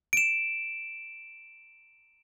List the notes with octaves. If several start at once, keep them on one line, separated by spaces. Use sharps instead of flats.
D7 E7